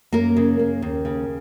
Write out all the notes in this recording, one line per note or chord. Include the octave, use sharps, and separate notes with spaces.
F#2 A#3 A#4
C#3
A#3
D#2
C#3